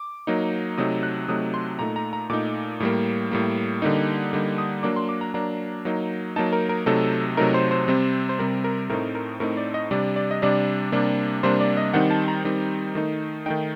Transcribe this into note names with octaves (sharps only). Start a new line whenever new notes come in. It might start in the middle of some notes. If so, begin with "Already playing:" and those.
Already playing: D6
F#3 A#3 D#4
C3 F#3 A3 D#4 D#6
F#6
C3 F#3 A3 D#4 D#6
C6
A#2 A3 D#4 A#5
A#5
A#5
A#2 A3 D#4 D6
A2 G3 A#3
A2 G3 A#3
D3 G3 A#3 D#4
D3 G3 A#3 D#4
D#6
F#3 A#3 D4 D6
C6
D6
A#5
F#3 A#3 D4 A#5
F#3 A#3 D#4
F#3 A#3 D#4 A5
A#4
A#4
C3 F#3 A3 D#4 A4
C3 F#3 A3 D#4 A#4
C5
C5
C3 G3 C4
C5
C3 G3 C4 A#4
A#4
A2 A3 C4 D#4 A#4
A#4
A2 A3 C4 D#4 A#4
D5
D#5
C3 G3 D4 D5
D5
D#5
C3 G3 D4 D5
C3 G3 A#3 D4
C3 G3 A#3 D4 C5
D5
D#5
D#3 G3 C4 D#4 F#5
A5
A#5
D#3 G3 C4 D#4
D#3 A3 D#4
D#3 A3 D#4 G5